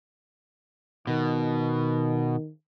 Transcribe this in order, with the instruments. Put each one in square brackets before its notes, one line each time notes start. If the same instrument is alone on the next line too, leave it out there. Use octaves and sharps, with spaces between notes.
[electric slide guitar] B2 [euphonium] D#3